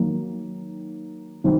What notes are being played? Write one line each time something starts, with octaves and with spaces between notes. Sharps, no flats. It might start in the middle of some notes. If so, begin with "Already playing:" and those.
Already playing: D#3 F#3 A#3
D#3 F#3 C4